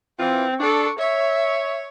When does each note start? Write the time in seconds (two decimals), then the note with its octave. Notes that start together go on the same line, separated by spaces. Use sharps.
0.19 E3 C4 F4
0.60 D4 A4 C#6
0.99 C#5 E5